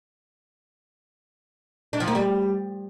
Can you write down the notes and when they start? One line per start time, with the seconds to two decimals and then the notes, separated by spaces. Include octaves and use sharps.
1.93 D4
2.00 F3
2.08 A#3
2.15 G3